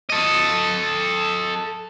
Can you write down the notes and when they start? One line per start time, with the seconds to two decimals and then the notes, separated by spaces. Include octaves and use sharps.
0.10 A4 D#5